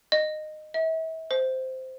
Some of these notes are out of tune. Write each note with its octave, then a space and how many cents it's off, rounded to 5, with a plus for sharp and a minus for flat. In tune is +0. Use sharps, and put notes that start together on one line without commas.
D#5 -15
E5 -40
C5 -10